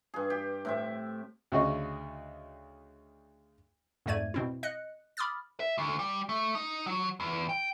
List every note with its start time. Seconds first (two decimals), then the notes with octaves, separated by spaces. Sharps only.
0.14 G2 G#4
0.30 G4
0.65 A2 C4 E5
1.52 D2 C#3 F#4 D#5
4.06 F2 G#2 A3 D5 G#6 D#7
4.34 B2 C4 E4
4.63 D#5 F#6 C#7
5.17 B5 D6 D#6 F6 A6
5.60 E5
5.78 D2
5.99 G3
6.29 A3
6.55 D#4
6.86 F#3
7.20 E2
7.49 G5